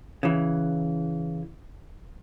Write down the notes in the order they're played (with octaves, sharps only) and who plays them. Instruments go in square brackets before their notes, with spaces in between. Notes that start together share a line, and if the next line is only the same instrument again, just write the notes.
[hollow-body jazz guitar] C#3 E3